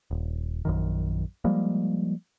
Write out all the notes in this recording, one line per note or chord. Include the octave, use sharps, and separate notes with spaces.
D#1
A#1 F#2 D#3
F3 G3 G#3 A#3